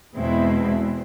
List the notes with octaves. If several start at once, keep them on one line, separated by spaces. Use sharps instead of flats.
E2 B2 G#3 C4 E4